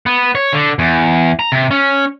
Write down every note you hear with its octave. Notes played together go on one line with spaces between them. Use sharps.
B3
C#5
D3
E2
A#5
C3
C#4